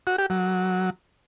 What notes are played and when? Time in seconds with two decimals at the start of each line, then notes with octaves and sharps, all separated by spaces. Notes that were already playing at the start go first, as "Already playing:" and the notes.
0.07 F#4
0.18 G4
0.30 F#3